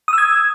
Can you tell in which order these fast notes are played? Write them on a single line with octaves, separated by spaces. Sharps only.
D#6 E6 G#6